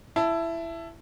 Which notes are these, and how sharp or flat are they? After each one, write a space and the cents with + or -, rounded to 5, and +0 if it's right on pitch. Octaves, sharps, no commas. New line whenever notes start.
E4 +15 A5 +0